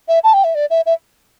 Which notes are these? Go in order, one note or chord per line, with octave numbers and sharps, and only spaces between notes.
E5
A5
G5
E5
D5
E5
E5